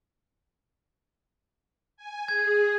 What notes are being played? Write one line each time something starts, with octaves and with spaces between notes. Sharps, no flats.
G#5
G#4 G#6